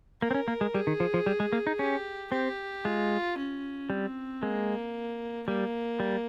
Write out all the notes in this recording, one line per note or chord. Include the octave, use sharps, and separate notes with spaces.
A#3 A#4
C4
C#4
A#3
G#3
G3 G#4
D#3
F3
F3
G3
G#3
A#3
D#4
C#4 G4
C4 G4
G#3 F4
C#4
G3 C4
G#3 A#3
G3 A#3
G3